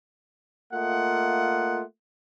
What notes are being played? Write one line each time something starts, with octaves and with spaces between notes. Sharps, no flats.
A3 A#3 F4 D#5 F#5